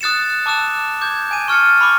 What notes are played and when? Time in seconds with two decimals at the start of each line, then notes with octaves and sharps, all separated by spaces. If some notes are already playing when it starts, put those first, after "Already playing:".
0.01 D#6 F#6 A6 C#7 E7
0.46 A5 D6 E6 F#6 E7
1.01 D6 G6 G#6
1.31 G#5 D#7
1.48 C#6 F6 A6 C#7
1.81 B5 C#6 D6